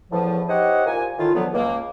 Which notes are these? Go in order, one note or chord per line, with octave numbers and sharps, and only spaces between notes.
E2 A2 C#3 F3
D#4 G4 C5 C#5 D#5 F#5
C2 A#2 A#3 G#5
A2 D#3 F4
E2 B2 D3 F3 F#3 B3
C#2 A#3